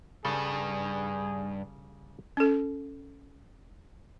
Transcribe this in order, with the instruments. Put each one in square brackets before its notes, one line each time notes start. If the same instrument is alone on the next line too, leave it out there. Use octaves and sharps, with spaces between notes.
[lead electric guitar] G2 [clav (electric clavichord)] C#3 G3 A4 [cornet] G#4
[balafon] C#4 A4